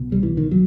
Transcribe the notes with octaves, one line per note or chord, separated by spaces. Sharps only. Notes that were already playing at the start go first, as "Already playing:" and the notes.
Already playing: C2 B2
G3
E3
D#3
F#3